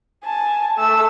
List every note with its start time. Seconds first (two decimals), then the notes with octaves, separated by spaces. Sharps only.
0.24 G#5 A5
0.77 A3 E6